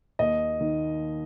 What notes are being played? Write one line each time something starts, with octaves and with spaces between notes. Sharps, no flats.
D#2 D#5
D#3